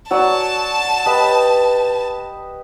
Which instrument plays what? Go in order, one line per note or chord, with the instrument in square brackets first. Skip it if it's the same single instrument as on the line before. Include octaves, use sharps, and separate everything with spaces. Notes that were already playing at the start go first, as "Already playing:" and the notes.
[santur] F#3 D5 G#5 [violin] A5
[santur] G4 B4 D#5